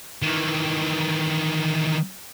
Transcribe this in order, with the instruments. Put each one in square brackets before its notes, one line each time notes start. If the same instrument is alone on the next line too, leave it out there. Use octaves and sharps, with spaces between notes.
[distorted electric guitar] D#3 E3